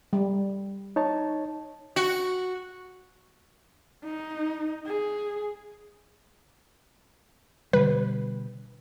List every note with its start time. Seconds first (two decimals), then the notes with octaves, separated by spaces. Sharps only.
0.13 G3
0.96 D#4 C#5 A5
1.96 F#4
4.04 D#4
4.87 G#4
7.73 B2 D3 G3 B4